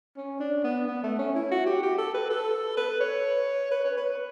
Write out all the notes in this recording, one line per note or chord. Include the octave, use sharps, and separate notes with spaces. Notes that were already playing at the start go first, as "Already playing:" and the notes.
C#4
D4
B3
B3
A3
C#4
E4
F#4
G4
G4
A4
B4
A4
B4
C#5
B4
C#5
B4